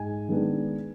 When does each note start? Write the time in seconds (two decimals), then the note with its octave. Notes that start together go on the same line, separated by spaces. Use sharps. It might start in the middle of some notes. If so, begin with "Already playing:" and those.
Already playing: G#2 G#5
0.29 D#3 G#3 B3 D4